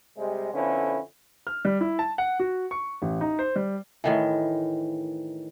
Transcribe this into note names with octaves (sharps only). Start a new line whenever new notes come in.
C3 G3 G#3
F2 D3 B3 C#4 E4
F6
G3
E4
A5
F#5
F#4
C#6
A1
D#4
C5
G3
A2 D#3 E3